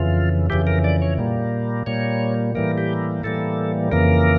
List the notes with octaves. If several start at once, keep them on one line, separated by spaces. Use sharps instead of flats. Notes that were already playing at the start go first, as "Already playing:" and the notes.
Already playing: F2 C#3 E3 F4
F2 C#3 E3 G4
A#4
D5
C#5
A#2 G3 A#3
A#2 G3 A#3 C#5
A2 E3 G3 A#3 A#4
G4
A2 E3 G3 A#3 A4
F2 C#3 E3 A#3 A#4